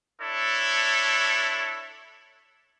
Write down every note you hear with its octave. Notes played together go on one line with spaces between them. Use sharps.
D4 E4 A4 C#5